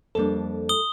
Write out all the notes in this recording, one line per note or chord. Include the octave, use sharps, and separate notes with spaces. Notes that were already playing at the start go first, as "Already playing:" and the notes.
F2 G3 A#3 D4 A4
D#6 G7